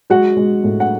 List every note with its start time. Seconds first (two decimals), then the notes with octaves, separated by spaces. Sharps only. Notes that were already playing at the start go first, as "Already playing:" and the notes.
0.10 G#3 F#4 F#5
0.37 G#3
0.64 A2
0.80 F#5